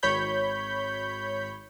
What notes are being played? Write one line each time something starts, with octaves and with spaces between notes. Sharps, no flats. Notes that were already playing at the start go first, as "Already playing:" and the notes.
G#1 C#5 B5 G6